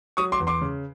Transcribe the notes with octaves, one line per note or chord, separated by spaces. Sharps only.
F#3 C#6 D#6
C6 D6
E2
C6 D6
C#3